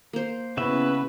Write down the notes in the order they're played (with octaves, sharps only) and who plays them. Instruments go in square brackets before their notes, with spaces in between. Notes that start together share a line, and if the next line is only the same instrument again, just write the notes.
[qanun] A#3 C5
[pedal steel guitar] C#3 F#4 E5 [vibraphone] B3 C#4 E4 [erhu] B4